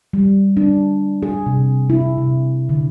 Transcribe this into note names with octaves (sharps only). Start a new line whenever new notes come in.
G3
D4
G#4
C3
E4
C3
D3